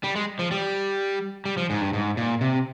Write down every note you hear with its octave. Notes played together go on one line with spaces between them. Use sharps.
G3
G#3
F3
G3
G3
F3
G#2
G2
G#2
A#2
C3